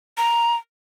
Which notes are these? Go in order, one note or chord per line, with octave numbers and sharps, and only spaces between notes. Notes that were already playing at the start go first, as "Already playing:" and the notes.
A#5